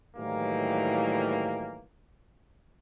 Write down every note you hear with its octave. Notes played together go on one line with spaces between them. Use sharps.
A2 D#3 E3 F#3 G3 A#3